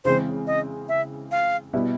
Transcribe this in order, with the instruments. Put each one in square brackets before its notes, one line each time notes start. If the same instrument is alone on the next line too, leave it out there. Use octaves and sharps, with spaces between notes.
[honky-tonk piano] C#3 E3 G#3 C4 [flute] C5
[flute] D#5
E5
F5
[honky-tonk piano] B2 G3 B3 E4